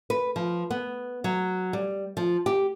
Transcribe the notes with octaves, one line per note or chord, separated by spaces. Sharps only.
B4
F3
B3
F#3
G3
F3
G4